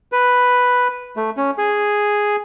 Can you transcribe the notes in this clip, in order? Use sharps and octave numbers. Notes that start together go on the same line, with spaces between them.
B4
A3
C#4
G#4